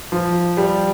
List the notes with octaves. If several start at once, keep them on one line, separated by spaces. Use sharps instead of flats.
F3
G3